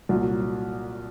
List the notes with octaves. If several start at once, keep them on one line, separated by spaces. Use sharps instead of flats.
C2 A#2 F#3